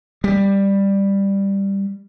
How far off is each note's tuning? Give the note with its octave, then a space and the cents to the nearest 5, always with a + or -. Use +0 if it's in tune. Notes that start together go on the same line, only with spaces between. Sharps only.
G3 +10